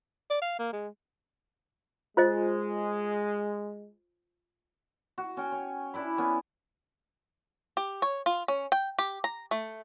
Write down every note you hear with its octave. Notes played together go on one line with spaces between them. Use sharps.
D5
F5
A#3
G#3
G#3 F4 C5 D#5
F#4
C#4 G5 G#5
C#5
D4 E4 B5
B3 C#4 G#5
G4
C#5
F4
C#4
G5
G4
A#5
A3